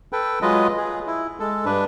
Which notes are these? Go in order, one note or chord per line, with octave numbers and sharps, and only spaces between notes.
A4 B4 G5
F#3 G#3 F4 B4 D#5
G#4
E4
G#3 A4
G2 D4 B4